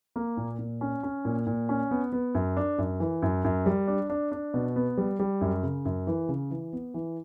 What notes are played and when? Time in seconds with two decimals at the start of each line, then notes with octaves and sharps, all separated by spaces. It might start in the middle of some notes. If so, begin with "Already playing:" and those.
0.16 A#3
0.37 A#2
0.59 A#2
0.81 C#4
1.03 C#4
1.25 A#2
1.47 A#2
1.69 C#4
1.91 B3
2.13 B3
2.35 F#2
2.57 D4
2.78 F#2
3.00 E3
3.22 F#2
3.44 F#2
3.66 G3
3.87 D4
4.10 D4
4.32 D4
4.54 B2
4.76 B3
4.98 G3
5.20 G3
5.41 F#2
5.63 C#3
5.85 F#2
6.07 E3
6.29 C#3
6.51 E3
6.73 B3
6.94 E3